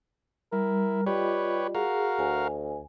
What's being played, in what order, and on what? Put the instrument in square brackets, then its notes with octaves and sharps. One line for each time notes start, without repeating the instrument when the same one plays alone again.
[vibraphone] G3 [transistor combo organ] E4 [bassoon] A#4
[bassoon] G3 [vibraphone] F4 D#5 [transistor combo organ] G4 B4 C#5
[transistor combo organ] F#4 A#4 F5 [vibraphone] G#4
[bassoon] D2 [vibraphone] G#5